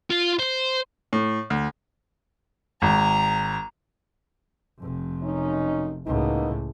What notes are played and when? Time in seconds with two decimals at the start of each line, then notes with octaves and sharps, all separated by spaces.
0.11 F4
0.39 C5
1.13 A2
1.50 D2
2.82 G#1 A#5
4.79 F1 F2
5.24 F#2 C#4 D#4
6.06 C#2 A2 A#3 B3 D#4